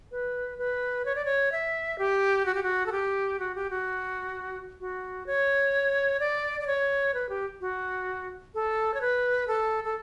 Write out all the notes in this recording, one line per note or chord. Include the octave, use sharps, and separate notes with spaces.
B4
B4
C#5
D5
C#5
E5
G4
F#4
G4
F#4
A4
G4
F#4
G4
F#4
F#4
C#5
D5
D5
C#5
B4
G4
F#4
A4
C#5
B4
A4
A4